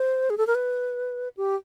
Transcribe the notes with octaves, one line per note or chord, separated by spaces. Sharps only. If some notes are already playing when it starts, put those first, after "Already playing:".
Already playing: C5
G#4
A4
A#4
B4
G4